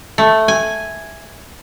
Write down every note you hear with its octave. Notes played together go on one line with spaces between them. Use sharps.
A3
G#5